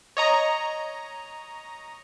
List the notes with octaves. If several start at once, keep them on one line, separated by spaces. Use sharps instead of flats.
C#5 D#5 A#5